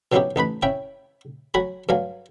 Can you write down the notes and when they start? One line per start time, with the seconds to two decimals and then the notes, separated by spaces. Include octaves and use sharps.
0.12 B2 F#3 C#4 D#4 E4 G4
0.36 A1 D#4 B4 B5
0.63 C#4 E4 E5 G5
1.54 F#3 F#4 G#5 B5
1.89 G2 F#3 F5 G#5